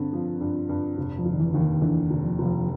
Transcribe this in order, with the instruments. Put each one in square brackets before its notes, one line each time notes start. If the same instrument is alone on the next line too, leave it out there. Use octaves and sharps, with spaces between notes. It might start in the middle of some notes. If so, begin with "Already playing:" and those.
Already playing: [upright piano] G2 D3 [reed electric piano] C4
[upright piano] F3
G2
G2
F1
[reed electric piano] F3
[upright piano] F1
[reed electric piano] D#3
E3
[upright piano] D#2 [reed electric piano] D3
[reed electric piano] D#3
[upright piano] D3 [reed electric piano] E3
[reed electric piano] D#3
[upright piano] F1
[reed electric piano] F3
[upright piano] F1
[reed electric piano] F3